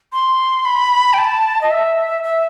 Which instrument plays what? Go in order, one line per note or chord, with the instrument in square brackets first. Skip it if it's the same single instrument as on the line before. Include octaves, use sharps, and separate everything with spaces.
[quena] C6
B5
G5
A5
D#5
E5
E5